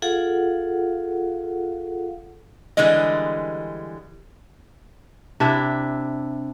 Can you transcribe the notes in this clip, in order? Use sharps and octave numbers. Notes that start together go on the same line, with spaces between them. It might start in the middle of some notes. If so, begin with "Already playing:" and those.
F4 G#4 A4 F5 F#5
D3 E3 G3 G#3 D#5
C3 D4 E4 E5